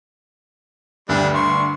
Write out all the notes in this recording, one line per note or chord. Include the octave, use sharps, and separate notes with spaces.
D2 G2 D3 G3 D4
C6 C#6